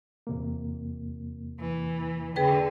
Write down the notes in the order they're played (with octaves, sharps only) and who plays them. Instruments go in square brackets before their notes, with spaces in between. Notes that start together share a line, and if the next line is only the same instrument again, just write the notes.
[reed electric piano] E2 C3 A#3
[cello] E3
[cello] D3 [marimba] G#4 B4 G5